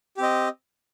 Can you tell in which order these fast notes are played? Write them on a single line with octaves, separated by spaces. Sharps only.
G4 C4 D#5